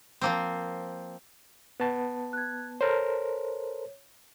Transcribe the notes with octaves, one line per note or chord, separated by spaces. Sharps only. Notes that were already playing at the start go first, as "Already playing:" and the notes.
F3 A#3 C4
B3 A5
F#6 G#6
A4 A#4 C5 C#5